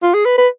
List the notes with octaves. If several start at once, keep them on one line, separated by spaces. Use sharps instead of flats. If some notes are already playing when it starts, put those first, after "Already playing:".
F4
G#4
B4
B4